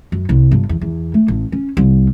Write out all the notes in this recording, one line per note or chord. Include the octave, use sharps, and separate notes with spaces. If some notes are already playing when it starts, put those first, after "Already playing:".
F#2
C2
G1
E2
E2
A3
A1
C#4
C2